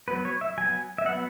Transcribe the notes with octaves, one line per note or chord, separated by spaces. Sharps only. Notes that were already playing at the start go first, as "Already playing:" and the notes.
F#3 B3 B4
C#5
E5
F#3 B3 G#5
E5
F#3 B3 F#5